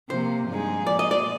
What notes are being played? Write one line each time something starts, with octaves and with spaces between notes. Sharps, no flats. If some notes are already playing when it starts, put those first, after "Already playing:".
C3 F3 A#3 C5
G2 F3 G#3 D#4 G#4
A#2 F3 G#3 D5
D#5
D5